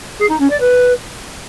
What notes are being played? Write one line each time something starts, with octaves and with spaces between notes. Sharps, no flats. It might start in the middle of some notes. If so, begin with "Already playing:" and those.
G#4
D#4
C#4
D5
B4